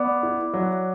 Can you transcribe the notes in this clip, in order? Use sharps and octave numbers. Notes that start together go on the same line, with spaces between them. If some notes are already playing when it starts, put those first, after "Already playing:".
Already playing: B3 D5 D6
E4
F#3